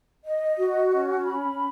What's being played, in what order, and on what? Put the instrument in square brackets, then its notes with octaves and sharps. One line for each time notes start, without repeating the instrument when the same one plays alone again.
[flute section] D#5
F#4
C#4
B5